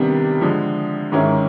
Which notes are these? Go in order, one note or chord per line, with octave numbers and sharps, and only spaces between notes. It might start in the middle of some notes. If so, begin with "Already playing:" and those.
Already playing: C3 D#3 G3 B3 D4
D3 F3 G#3
G#2 D#3 G#3 C#4 E4